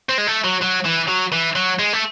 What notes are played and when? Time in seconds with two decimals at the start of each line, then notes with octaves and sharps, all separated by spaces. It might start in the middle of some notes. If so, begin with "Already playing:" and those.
0.09 C4
0.18 G#3
0.27 A3
0.44 F#3
0.62 F#3
0.85 E3
1.08 F#3
1.32 E3
1.56 F#3
1.79 G#3
1.93 A3